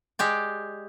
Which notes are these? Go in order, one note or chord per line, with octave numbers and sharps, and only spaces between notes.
G#3 G4 D5